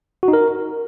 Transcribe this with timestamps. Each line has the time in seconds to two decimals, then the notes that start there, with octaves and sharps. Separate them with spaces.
0.23 F#4
0.28 D#4
0.33 A#4